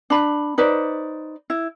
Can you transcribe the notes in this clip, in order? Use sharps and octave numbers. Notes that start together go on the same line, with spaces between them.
D4 B5
D#4 B4 C5 D5
E4